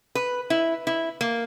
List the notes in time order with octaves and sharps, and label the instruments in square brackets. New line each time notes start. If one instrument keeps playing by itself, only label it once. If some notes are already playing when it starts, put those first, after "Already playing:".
[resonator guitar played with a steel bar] B4
E4
E4
A#3